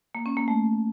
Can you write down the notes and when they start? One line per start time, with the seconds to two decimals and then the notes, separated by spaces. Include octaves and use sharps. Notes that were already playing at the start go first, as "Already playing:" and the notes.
0.15 A#3
0.26 C#4
0.37 A#3
0.48 A3